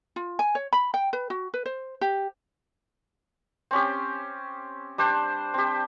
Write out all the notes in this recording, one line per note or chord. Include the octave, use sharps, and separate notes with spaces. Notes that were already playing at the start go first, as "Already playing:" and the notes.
F4
G#5
C#5
B5
G5
B4
F#4
B4
C5
G4
C4 C#4 G4
G3 D4 C5
C4 G4